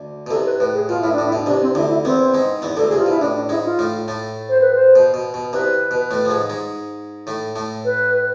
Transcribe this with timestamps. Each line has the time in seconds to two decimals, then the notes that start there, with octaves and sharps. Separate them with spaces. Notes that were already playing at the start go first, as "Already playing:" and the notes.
Already playing: D2 D3
0.27 B2
0.30 C2 C3 A4
0.45 B4
0.59 A2 B4
0.74 G#4
0.88 B2 F4
1.00 A2 E4
1.13 D4
1.18 A2
1.25 E4
1.32 B2
1.43 E4
1.46 C2 C3 D4
1.62 C4
1.75 D2 D3 E4
1.90 E4
2.05 E2 E3 C4
2.34 G#2 G#3
2.62 E2 E3
2.76 D2 D3 A4
2.88 C2 C3 G#4
2.98 F4
3.06 B2 E4
3.21 A2 D4
3.35 D4
3.49 G#2 G#3 E4
3.65 F4
3.79 A2 A3
4.08 A2 A3
4.49 C5
4.61 B4
4.74 C5
4.95 B2
5.14 B2
5.34 B2
5.52 C2 C3 B4
5.91 B2
6.11 A2 A3
6.25 F3
6.30 G#2 G#3
6.50 G#2 G#3
7.27 A2 A3
7.56 A2 A3
7.85 B4